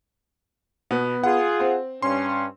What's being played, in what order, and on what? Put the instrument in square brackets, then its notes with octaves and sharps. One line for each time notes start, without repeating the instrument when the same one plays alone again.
[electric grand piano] B2 [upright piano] B3
[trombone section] F4 G#4 [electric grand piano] F#5
[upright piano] C4
[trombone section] G2 C#4 [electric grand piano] C6